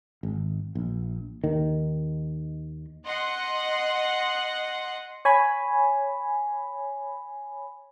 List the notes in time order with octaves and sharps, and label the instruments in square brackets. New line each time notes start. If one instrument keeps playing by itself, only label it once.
[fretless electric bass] G#1
A#1
D#2 D#3
[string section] D#5 F#5 C6
[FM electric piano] C#5 G#5 B5